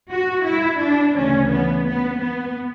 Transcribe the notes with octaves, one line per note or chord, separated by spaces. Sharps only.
F#4
E4
D4
D2 C#3 E3 C#4
B3
B3
B3